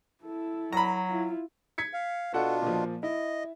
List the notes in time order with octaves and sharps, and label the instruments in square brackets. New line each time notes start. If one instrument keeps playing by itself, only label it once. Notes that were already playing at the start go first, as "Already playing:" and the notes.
[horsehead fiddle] E4 A4
[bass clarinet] F#3 [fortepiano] A#5 B5
[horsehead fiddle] E4 F4
[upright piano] G#6 B6 C#7
[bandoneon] F5
[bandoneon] B2 D4 F4 [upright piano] F#4 A4 F#5
[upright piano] A#2 F3
[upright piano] E4 [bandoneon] D#5